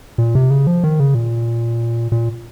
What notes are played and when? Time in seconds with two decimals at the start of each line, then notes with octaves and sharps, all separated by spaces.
0.18 A#2
0.35 C3
0.50 C#3
0.67 F3
0.84 D#3
1.00 C#3
1.15 A#2
2.12 A#2